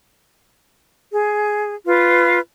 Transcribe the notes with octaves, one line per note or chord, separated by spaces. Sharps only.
G#4
F4 B4